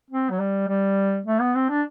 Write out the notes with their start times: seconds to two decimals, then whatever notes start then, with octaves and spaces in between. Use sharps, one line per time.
0.10 C4
0.30 F#3
0.40 G3
0.68 G3
1.26 A3
1.41 B3
1.55 C4
1.70 D4